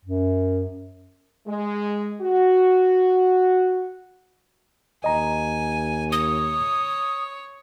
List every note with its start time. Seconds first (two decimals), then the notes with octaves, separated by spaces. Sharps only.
0.05 F#2
1.48 G#3
2.22 F#4
5.04 D#2 D#5 G#5 A#5
6.12 C#5 D#6